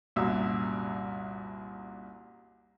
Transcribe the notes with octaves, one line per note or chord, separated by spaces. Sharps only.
C2 F#2 A#2 E5 E6